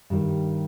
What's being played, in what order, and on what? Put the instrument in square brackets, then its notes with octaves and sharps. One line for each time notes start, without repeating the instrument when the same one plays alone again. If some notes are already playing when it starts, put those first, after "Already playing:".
[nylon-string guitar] G2 D#3 G3